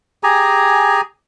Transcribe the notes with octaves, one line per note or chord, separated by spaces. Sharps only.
G4 G#4 G#5 A#5